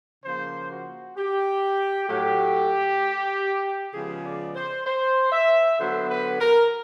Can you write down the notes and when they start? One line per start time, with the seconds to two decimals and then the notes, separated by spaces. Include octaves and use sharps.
0.24 C#3 F3 A#3 C5
0.71 F#4
1.17 G4
2.09 A2 F#3 A3 G4
3.93 C#3 F3 G#3 B3 G#4
4.24 D5
4.55 C5
4.86 C5
5.32 E5
5.78 D3 F#3 B3 C5
6.09 B4
6.40 A#4